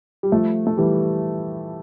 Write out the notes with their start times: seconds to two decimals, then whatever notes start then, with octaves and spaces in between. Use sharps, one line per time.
0.23 G3
0.32 F3 A3
0.67 A3
0.77 E3 G3